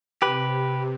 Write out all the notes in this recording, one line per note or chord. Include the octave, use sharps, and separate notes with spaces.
C3 G4 B4